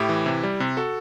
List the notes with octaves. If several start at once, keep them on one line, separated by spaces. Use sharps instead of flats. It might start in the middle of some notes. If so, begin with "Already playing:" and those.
Already playing: A2 E4 G4
E3
C3
G3
C3
F#4 A4